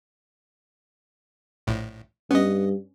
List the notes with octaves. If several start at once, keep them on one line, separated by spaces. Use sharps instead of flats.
A#1 A2
G2 B3 C#4 D#5